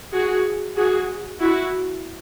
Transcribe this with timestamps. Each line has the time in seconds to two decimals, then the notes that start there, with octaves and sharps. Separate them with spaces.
0.13 F#4 G#4
0.76 F#4 G#4
1.40 E4 F#4